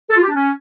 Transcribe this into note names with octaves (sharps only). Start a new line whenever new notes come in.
A4
F4
G4
D4
C#4